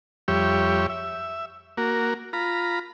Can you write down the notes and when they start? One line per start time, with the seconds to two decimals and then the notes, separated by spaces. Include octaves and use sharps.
0.28 F2 G3 G4 C#5 E5
0.90 E5
1.77 A#3 F#4 A#4
2.33 F4 A#5 B5